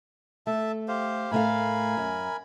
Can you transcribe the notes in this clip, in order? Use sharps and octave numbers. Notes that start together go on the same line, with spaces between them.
A3 E5 A5
G4 C5 F5
A2 A3 A#4 F5 G#5 B5
F#2